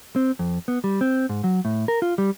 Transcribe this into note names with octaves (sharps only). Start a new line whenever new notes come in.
C4
F2
B3
G3
C4
G#2
F#3
A2
A#4
F4
G3